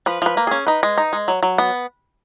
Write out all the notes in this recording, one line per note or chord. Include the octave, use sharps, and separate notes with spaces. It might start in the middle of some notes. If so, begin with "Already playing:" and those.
F3 B4
F3 B4
A#3
C#4 G#4
D#4 B4
G#3
D#4
G#3
F#3
F#3
B3